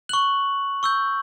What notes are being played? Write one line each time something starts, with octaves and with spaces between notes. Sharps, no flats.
C#6 F#6 F#7
C#6 E6 G6